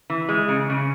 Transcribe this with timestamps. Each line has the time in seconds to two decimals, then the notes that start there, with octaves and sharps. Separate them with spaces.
0.10 E3
0.29 G#3
0.49 C#3
0.70 C#3